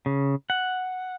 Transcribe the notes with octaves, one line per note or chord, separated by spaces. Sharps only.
C#3
F#5